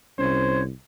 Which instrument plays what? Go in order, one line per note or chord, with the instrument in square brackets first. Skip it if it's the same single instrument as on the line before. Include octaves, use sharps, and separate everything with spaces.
[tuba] C2 [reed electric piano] C#4 [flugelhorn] C5 [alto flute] C#5